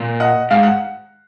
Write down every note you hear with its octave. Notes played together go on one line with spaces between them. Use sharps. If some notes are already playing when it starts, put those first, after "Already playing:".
Already playing: A#2
D#5 F#5
G#2 F5
F#5